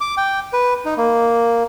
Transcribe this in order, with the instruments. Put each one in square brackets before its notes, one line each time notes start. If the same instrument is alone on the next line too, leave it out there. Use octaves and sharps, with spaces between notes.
[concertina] D6
G5
B4
D#4
A#3